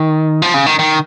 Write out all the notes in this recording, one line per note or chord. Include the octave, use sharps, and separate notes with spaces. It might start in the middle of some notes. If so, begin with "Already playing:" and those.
Already playing: D#3
F3
C#3
D#3
D#3